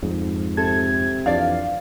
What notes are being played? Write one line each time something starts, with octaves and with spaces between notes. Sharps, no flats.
F2 G#2
C3 A4 G#6
F2 E3 D4 D5 F5